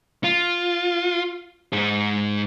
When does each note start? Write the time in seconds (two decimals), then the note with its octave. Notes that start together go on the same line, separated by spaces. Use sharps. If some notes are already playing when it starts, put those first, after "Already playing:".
0.24 F4
1.73 G#2 G#4